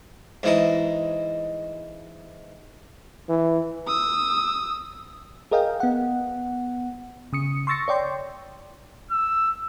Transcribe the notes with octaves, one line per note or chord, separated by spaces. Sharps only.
G#2 E3 D#4
E3
D#6 E6
G#4 A#4 D#5 F5 G5
B3 F#5
C#3 D#6 C#7
C6 C#6 E6 A6 A#6 C#7
C#5 D5 G5 C6
E6